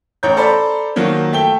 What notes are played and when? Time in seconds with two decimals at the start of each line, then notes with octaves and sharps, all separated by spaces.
0.23 A1 C#5 A#5 G6
0.37 A4 C5 D5 A#5 B5
0.96 D#3 F3 F#3 A#3
1.33 A3 G5 G7